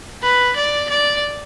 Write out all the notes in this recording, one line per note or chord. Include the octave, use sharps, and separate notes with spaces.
B4
D5
D5